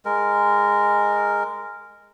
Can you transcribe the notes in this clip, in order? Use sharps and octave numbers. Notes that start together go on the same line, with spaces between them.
G#3 A#4